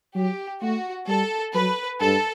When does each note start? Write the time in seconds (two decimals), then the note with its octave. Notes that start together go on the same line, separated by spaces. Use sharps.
0.15 F#3 G4
0.61 A3 F#4
1.07 G3 A4
1.54 F#3 B4
2.00 G2 A4